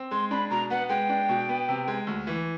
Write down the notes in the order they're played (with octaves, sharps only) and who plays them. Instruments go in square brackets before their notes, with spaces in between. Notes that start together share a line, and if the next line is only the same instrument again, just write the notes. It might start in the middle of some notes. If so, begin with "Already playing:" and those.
Already playing: [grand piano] C4
[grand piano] G#3 [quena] C6
[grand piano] D4 [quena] B5
[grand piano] B2 [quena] A#5
[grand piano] B3 [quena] F#5
[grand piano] G#3 [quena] G5
[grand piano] D4
B2
B3
C3
G#3
D2
E3